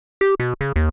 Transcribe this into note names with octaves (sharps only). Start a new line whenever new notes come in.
G4
B2
C#3
D#2